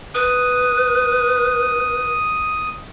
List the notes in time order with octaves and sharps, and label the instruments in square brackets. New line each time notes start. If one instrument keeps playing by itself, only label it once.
[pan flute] B4 [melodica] D#6